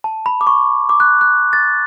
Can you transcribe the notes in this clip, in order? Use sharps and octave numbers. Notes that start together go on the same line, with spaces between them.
A5
B5
D6
C#6
D6
F#6
F#6
A6